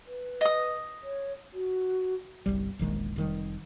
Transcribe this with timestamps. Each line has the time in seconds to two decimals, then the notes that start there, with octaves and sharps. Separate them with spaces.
0.07 B4
0.41 D#5 D#6
1.03 C#5
1.53 F#4
2.46 G1 C2 G3
2.79 E1 A#1 D#3 G#3
3.16 F1 D#3 G3